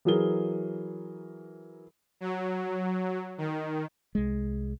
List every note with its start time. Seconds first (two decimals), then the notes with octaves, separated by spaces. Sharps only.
0.05 E3 F#3 G#4 A#4 G7
2.20 F#3
3.38 D#3
4.15 C2 G#3